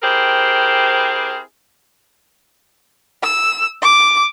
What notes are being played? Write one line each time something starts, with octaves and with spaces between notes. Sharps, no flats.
C4 E4 G4 G#4 A#4 C5
E6
D6